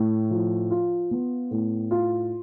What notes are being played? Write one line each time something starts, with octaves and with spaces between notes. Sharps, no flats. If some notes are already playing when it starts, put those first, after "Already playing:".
Already playing: A2
F3
F4
B3
A2
F4